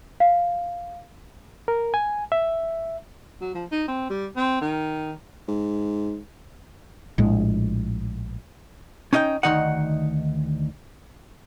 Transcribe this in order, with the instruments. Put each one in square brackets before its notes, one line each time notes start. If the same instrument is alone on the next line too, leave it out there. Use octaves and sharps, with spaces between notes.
[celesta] F5
[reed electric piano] A#4
G#5
E5
[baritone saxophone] F#3
F3
D#4
C4
G3
C4
D#3
[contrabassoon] G#2
[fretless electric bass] A#1 A2 G#3
[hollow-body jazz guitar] C#4 D#4 D#5 E5 G5
D2 G#2 D#3 D#4 D#5 F#5